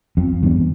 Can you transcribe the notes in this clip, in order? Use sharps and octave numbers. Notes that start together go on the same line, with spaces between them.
F2
E2 G2